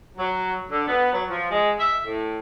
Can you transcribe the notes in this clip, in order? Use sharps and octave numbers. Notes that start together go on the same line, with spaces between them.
F#3
D3
B3
F#3
F3
G#3
E5
A2